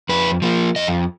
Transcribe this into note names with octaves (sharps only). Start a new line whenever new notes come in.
F2 B4
F3 A#3
F2 D#5